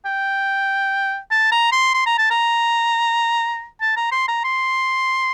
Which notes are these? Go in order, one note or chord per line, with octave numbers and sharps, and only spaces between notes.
G5
A5
A#5
C6
C6
A#5
A5
A#5
A5
A#5
C6
A#5
C6